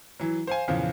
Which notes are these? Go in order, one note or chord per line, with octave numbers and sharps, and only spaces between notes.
E3 F#3
C5 F5 G#5
E2 A#2 C#3 F3